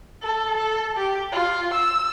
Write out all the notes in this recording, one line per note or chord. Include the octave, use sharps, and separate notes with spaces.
A4
A4
G4
F4
E6